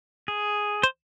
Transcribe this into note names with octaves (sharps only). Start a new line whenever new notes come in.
G#4
C5